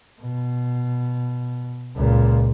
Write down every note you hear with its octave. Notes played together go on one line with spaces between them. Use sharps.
B2
C#2 A#2